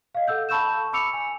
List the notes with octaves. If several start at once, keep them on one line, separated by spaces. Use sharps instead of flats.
D#5 F5
A4 F#5 E6 G6
A5 B5 C#6 E6 G6 E7
B5 D6 E6 C#7 F7
G#5